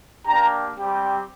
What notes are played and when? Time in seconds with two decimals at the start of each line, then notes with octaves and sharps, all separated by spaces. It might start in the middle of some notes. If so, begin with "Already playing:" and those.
0.25 A#3 D4 G4 A#5
0.77 G3 C4 G4